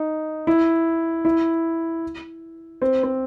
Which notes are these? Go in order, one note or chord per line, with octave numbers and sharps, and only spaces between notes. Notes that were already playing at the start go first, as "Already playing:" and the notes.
Already playing: D#4
E4
E4
C4
C4